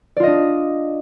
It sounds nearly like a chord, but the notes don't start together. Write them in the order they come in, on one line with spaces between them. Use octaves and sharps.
D5 F4 D#5 D4